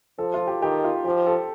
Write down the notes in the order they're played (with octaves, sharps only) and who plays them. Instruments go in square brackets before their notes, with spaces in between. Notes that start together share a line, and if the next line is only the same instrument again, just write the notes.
[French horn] F3 [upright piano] A4
[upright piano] F4
G4
[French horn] D#3 [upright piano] G4
[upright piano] F4
[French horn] F3 [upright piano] G4
[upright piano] A4